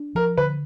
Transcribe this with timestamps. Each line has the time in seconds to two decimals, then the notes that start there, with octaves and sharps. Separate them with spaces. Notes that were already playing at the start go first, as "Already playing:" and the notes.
Already playing: D4
0.15 F3 A#4
0.37 D3 B4